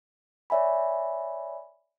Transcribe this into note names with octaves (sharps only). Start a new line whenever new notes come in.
C#5 D5 E5 G#5 B5